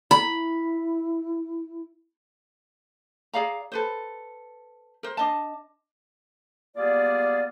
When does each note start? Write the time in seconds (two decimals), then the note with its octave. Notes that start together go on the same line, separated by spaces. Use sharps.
0.11 E4 B5
3.33 G#4 D5 F5 A#5
3.72 A4 B4 C5
5.03 A#4 C5
5.17 D4 D#5 A5
6.76 G3 A#3 B3 F4 G#4 D5